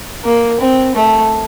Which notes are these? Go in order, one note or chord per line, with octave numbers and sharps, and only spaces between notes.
A#3
C4
A3